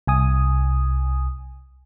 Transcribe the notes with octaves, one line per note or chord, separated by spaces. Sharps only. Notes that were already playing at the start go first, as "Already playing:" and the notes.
C2 G#5 D#6